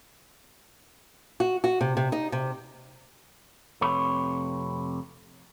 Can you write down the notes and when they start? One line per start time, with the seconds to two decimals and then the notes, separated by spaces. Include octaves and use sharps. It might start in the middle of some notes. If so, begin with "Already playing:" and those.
1.40 F#4
1.64 F#4
1.81 C3
1.97 C3
2.12 D#4
2.32 C3
3.81 F2 C3 A3 B4 C#5 B5